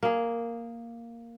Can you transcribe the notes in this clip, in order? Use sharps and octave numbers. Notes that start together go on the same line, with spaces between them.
A#3 G#4